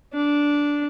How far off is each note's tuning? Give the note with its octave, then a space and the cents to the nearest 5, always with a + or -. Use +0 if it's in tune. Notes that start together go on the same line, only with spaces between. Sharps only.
D4 -10